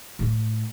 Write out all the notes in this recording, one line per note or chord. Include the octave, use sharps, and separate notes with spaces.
A2